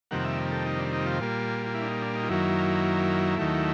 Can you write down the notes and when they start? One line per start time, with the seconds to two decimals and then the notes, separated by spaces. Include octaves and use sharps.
0.11 F2 C3 D#3 G3 A#3 F#5
0.25 E5
0.52 A4
0.66 D#4
0.79 D4
0.93 D#4
1.06 F4
1.20 A#2 G3 A#3
1.66 F4
1.74 E4
1.82 D4
1.88 D#4
2.02 D4
2.15 D#4
2.23 F4
2.29 F#2 D#3 F#3 A#3 E4
3.38 D#2 D#3 F#3 A3